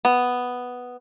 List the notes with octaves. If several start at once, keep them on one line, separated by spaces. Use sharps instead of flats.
B3